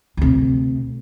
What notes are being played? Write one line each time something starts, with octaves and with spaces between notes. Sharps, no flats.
D2 C3